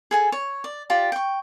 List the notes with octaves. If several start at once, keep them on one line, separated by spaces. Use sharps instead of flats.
G#4 A4 G#5
C#5
D5
F4 G4 D5 A5
G5 C#6